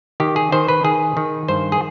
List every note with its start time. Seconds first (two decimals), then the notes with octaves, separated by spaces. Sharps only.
0.20 D#3 G4
0.36 G#4
0.52 D#3 C5
0.68 B4
0.84 D#3 G#4
1.17 D#3
1.48 G2 C5
1.72 G#4